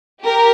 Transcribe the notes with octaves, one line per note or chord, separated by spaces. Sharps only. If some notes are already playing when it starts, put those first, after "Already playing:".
G4 A#4